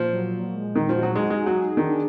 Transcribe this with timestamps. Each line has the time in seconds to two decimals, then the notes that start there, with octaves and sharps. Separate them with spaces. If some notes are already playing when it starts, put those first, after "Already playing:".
Already playing: A#2 F3
0.13 F#3
0.34 A#2
0.54 G#3
0.74 D#3 D#4
0.89 F3
0.95 F#4
1.03 F#3
1.15 G#3 D#4
1.30 G#3
1.36 G#4
1.46 F#3
1.57 G#4
1.77 D#3 D4